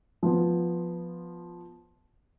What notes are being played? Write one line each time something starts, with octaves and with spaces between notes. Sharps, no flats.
F3 B3